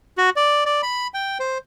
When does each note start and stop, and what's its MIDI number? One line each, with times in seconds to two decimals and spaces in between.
0.18 0.30 66
0.36 0.64 74
0.66 0.82 74
0.83 1.07 83
1.14 1.38 79
1.40 1.58 72